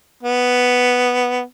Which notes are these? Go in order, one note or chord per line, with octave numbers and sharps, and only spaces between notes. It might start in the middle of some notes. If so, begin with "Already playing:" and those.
B3